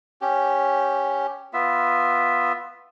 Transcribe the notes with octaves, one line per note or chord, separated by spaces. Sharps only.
C#4 G4
B3 F4 E5